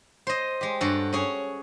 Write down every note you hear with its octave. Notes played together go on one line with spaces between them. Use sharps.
C5 D#5
G#3 G4
G2 F#4 A4
C#4 G#4 C#5